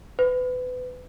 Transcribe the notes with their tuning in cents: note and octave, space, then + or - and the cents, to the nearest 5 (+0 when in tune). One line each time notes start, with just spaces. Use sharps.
B4 +25